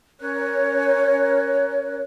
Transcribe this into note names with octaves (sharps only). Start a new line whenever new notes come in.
C#4 A#4 C#5 F#6